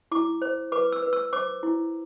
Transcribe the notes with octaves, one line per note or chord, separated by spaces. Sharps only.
E4 D6
C5
B4 D6
E6
B4
E6
C5 D6
E4